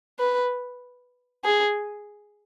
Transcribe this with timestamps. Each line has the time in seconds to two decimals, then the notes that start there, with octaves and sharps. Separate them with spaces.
0.19 B4
1.44 G#4